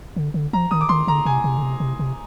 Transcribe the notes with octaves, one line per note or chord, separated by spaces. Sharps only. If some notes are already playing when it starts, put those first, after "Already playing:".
D3
D3
F3 A#5
D#3 D#6
D6
D#3 C6
D3 A#5
C3 G#5
C3
D3
C3
C3
C3